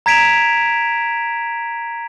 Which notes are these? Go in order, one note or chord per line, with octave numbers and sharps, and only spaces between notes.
A#5 G#6 B6 D7 E7 F7